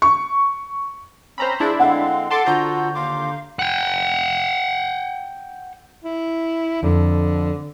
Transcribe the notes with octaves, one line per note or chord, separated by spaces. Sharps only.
C#6
C4 C#4 C5 A#5 B5
F3 D4 E4 F4 G#4 G6
D3 G#3 C4 F5 F#5
A4 A5 C6 D6
D3 F4 F#4 A4 C5 A#5 G6
D#2 F4 F5 D6
F#5 G5
E4
F2 D3